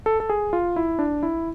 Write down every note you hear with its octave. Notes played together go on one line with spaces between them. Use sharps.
A4
A4
G#4
F4
E4
D4
E4